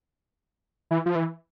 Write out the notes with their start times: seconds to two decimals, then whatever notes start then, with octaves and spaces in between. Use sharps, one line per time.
0.91 E3
1.06 F3
1.15 E3